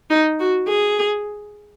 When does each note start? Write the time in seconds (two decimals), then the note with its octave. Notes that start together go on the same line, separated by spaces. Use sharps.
0.10 D#4
0.40 F#4
0.68 G#4